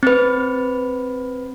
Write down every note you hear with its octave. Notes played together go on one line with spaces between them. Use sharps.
C4 B4